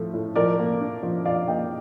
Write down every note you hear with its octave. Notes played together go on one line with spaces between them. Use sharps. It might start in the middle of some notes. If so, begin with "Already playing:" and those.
Already playing: A2 F3 A3
A2
F3 A#4 D5
A#3
D4
F3
F3 D5 F5
A#3 D#5 G5